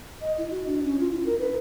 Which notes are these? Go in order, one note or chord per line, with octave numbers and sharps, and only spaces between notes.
D#5
E4
F#4
D4
C#4
F4
E4
A#4
B4